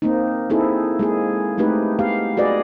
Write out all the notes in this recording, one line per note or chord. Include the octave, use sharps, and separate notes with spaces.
A#3 C4 D#4
A#3 C4 D#4 E4 G#4 A4
G#3 A#3 G#4
A3 C4 D#4 G4 B4
G#3 B3 G4 F5
F#4 G#4 B4 D5 D#5